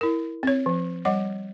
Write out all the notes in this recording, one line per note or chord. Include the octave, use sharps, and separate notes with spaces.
E4 A#4
C4 C#5
F3
G3 D#5 F#5